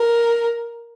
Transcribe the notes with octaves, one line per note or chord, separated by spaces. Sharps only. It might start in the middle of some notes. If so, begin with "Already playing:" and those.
Already playing: A#4